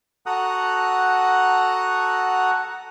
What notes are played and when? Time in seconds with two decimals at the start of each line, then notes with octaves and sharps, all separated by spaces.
0.26 F#4 A4 F#5 A#5 D#6 F#6